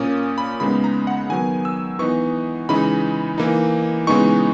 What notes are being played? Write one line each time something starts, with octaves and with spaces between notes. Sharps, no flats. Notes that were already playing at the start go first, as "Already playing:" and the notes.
Already playing: A#2 A#3 C#4 D#6
B5
C#3 G#3 B3 D#4 B5
A#5
F#5
D#3 F#3 B3 G#5
E6
E3 B3 D#4 C#6
C#3 E3 G#3 D#4 B5
E3 A#3 D#4
C#3 E3 G#3 B3 D#4 C#6